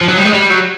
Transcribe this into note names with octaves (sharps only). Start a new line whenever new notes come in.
F3
F#3
G3
G#3
G3
F#3